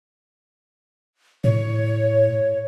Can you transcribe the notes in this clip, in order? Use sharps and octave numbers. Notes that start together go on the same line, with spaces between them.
A2 C#5